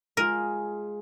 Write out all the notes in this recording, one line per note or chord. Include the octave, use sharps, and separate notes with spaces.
G#3 F4 G#4 A#4